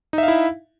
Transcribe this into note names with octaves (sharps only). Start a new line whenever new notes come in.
D#4 E4 E5 F5